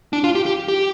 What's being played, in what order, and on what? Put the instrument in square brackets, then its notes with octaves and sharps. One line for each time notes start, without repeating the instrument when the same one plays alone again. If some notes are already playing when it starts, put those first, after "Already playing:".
[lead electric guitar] D4
F4
G4
G4
G4